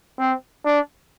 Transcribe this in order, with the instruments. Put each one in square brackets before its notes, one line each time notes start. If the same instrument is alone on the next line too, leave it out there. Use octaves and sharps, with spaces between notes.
[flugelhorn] C4
D4